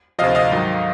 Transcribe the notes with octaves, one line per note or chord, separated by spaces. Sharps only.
D2 C3 F3 D#5 F5
D#5 F5
G#2 D#3 F#3